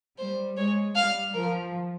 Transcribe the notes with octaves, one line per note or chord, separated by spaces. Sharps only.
G3 C5
G#3 C#5
G3 F5
F3 A#4